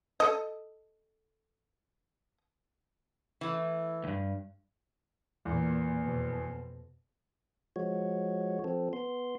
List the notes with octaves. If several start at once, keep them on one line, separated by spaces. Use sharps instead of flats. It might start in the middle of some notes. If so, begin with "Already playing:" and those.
A4 D#5
E3 A3 E4
D2 G2
E2 A#2 A#3
F2 B2
F3 G#3 F#4 C#5
F3 C4 A4
B3 C6